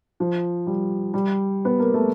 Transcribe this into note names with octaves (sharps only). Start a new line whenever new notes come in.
F3
G3
G3
B3
A#3
A3